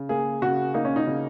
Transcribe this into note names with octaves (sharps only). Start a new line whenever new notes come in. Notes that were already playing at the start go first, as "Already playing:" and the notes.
Already playing: C#3
A#3 G#4
C#3 F#4
A#3 D#4
C#4
D#4
C#3